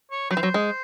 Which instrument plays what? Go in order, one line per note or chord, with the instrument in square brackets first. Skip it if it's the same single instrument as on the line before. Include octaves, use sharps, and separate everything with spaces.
[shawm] C#5
[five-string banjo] F#3 [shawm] C5
[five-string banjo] E3
F#3
G#3